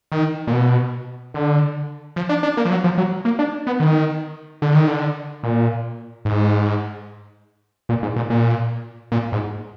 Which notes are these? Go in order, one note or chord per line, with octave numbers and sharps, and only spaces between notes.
D#3
A#2
B2
D3
F3
D4
D4
A#3
F3
F#3
F3
F#3
A#3
D4
B3
D#3
D3
D#3
D3
A#2
G#2
A#2
G#2
A#2
A#2
A#2
G#2